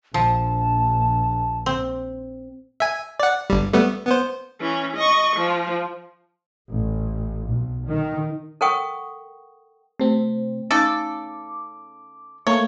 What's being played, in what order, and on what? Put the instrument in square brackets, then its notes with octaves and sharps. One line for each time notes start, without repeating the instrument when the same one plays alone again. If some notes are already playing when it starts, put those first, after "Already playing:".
[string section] A#1 [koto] F3 [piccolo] A5
[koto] C4
[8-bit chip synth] E5 G#5
D5 F#5
G1 G3
G3 A3 B3
B3 C5
[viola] E3 C#4
D#5 C#6
F3
[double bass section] A1
B1
D#3
[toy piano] A4 A#4 F#5 G5 C#6 D#6
[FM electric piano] C3 C4 [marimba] A3
[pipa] C#3 A4 [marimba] C#4 D#4 [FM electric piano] D6
[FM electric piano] A3 A#3 [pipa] C#5